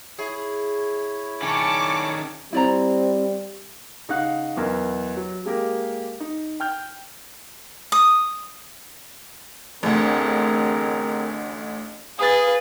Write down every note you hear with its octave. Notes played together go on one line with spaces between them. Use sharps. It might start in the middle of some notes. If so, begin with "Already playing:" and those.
E4 G#4 C#5
D#3 C#4 A5 C#6 D6
G3 C4 E4 D5 A#5
C#3 D#4 F5 F#5 F#6
B1 E2 A#4
F#3
G#3 A#3 G4 A#4
D#4
G5 F6 G6
D#6
A1 D2 C4 G#4 A#4
G#4 B4 F5 D#6 A6